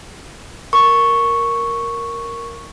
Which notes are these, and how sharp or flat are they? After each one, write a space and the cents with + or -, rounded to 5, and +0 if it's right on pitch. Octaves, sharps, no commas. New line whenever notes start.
A#4 +0 C#6 +0